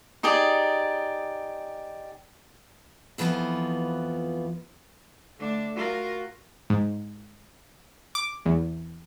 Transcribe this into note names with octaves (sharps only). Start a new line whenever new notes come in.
D#4 G4 G#4 D5
F2 E3 F3 B3 F4 B4
D3 A3 D4
F4 F#4 A#4
G#2
D6
E2